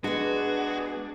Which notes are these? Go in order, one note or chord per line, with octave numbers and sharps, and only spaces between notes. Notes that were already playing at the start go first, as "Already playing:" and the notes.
G#3 B3 D4 F#4 G#4 B4